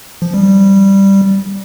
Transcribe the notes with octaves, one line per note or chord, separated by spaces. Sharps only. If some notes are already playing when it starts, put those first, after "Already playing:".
F3
G3